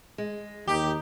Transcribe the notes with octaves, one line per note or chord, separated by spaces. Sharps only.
G#3
D#2 D#4 G4